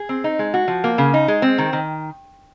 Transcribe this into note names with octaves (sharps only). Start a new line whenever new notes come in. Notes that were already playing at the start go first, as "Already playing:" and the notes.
Already playing: G#4
C4
D#4
G#3
F#4
F3
A#3
C#3
D#4
G#3
C4
D#3
D#3